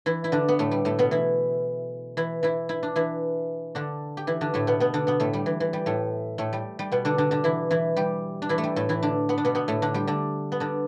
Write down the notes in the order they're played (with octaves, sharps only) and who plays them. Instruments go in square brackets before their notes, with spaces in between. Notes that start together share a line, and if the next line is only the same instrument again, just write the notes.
[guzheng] E3 E4
E4
D3 D4
B3
A2 A3
G3
A2 A3
B2 B3
E3 E4
E3 E4
E3 E4
E4
D4
E3 E4
D3 D4
G4
E3 E4
D3 D4
A2 A3
B2 B3
B2 B3
D3 D4
B2 B3
A2 A3
G3
E3
E3
G3
A2 A3
A2 A3
G3
G3
B2 B3
D3 D4
D3 D4
D3 D4
E3 E4
E3 E4
G3 G4
D4
E3 E4
A3
G3
A2 A3
E3 E4
D3 D4
B3
D4
B2 B3
B2 B3
A2 A3
D3 D4
G3 G4
D3 D4
B3
D3 D4